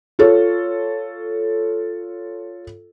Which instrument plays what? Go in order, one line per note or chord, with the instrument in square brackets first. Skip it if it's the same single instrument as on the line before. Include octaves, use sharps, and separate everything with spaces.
[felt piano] F4 A4 C#5